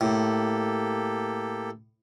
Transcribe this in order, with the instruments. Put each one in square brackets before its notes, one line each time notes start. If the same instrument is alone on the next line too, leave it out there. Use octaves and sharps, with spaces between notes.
[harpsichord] A2 [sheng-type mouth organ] A#3 G4 A4